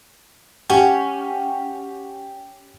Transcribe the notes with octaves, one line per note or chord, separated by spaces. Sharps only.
C#4 F#4 G4